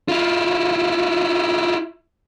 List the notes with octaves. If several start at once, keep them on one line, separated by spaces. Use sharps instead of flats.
E4 F4